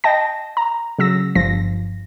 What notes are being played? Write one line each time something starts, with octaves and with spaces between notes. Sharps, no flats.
D#5 G5 A5 A#6
A#5
C#3 F#3 E6 A#6
G1 G2 F3 A#6